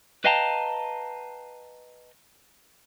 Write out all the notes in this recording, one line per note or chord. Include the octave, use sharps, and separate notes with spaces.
B4 D#5 F5 G5 A5 A#5